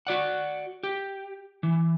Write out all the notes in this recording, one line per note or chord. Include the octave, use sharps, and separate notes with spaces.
F#4 D5 F#5
G4
E3